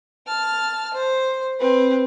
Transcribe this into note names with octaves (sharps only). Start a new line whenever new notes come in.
A5 F6
C5
C4 B4